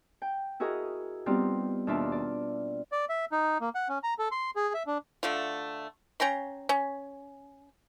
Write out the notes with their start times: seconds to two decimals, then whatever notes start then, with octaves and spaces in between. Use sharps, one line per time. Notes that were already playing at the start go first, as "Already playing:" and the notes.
0.22 G5
0.60 E4 F#4 G#4 A#4 D#5
1.26 G3 B3 C4 D#4 F4 G4
1.87 D#2 B2 D4 F4 E5 D6
2.12 D5
2.92 D5
3.09 E5
3.32 D#4
3.61 A#3
3.75 F#5
3.89 C#4
4.03 A#5
4.19 A4
4.32 C6
4.56 G#4
4.74 E5
4.87 D4
5.23 D3 A3 F4
6.20 C#4 G5 A#5 C6
6.69 C#4